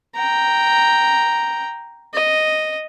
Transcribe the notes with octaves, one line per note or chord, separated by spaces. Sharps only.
G5 A#5
D#5